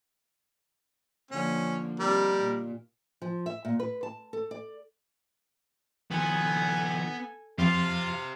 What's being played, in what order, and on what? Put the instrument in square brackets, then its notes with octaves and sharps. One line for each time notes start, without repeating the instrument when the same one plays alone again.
[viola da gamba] D3 F3 A#3 [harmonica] C#4
[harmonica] G3 A#4 [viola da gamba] C4 D#4 G4
[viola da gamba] A#2
[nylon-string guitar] F3
E5
A#2
B4
A5
A4
D5
[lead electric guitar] D#3 F3 [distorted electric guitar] B3 [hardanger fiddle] A4 G#5
[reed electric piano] F2 [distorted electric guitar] F4 [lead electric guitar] G4 C5 [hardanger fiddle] F5 A5